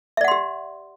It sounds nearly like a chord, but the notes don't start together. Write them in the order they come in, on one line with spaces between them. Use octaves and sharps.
E5 D5 F#5 C6 G4